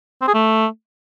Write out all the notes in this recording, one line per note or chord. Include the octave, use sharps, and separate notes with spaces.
C4
G#4
A3